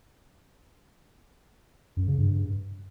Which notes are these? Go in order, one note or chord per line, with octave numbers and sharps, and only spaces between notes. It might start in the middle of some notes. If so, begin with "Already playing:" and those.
F#2
C#3
G2